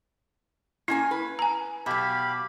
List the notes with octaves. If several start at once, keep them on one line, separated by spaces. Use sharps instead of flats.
A#3 C#4 E4 G#5
B4
G#5 A#5
B2 F#3 G4 F5 B5